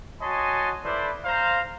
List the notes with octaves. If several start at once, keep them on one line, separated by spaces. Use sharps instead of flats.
F#4 C#5 D#5 G#5 A5 C6
E4 A4 B4 C5 D5
C5 F5 A#5